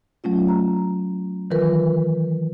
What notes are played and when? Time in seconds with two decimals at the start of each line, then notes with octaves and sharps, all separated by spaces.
0.24 F#3 A3 C#4 F4
0.48 A#5
1.51 D#3 E3 F#3 F4 A#4 B4